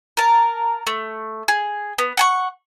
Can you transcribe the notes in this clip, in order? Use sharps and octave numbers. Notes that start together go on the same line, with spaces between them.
A#4 A5
A3
G#4
B3
F#5 G#5 C#6